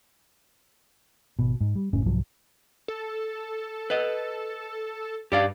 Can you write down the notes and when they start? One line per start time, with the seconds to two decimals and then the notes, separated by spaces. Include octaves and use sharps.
1.39 G#1 B2
1.61 G#2
1.76 G3
1.93 F#1 A2 C#4
2.06 C2 G#2 F3 F#3
2.88 A4
3.90 B4 D#5
5.32 G2 G4 D5 F5